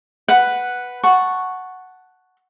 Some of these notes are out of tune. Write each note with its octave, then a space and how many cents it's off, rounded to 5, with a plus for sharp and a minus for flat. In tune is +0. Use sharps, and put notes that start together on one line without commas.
B4 +0 F#5 +0
F#5 +0 A5 +0 C#6 +0